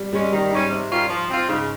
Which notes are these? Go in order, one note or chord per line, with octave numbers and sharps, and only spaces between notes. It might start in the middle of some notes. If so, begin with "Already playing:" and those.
Already playing: G3
G3 G#3 C#4
D#3 G3
G#2 G3 C#4
C3
D#3 G3 C#4 F4
F3
C4 F4
G#2 C#3